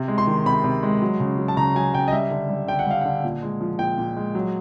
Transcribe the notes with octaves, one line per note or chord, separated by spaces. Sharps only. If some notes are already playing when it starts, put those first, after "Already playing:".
Already playing: C3
G#3
C6
D#3
C3 B5
C3
G#3
F#3
C#3
F#3
A5
C#3 A#5
F#3 G#5
C#3 G5
D#5
G3 E5
D3
G3
D3 G5
F#5
G3 F5
D3 F#5
A#2
G#3
F3
A#2 G5
A#2
G#3
F#3